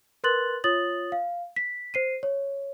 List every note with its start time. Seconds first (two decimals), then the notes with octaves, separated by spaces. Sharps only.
0.24 A#4 B4 C6 F#6 A6 F#7
0.64 F4 C#5 D#6 A6 F#7
1.12 F5
1.56 B6
1.94 C5 C7 D#7
2.23 C#5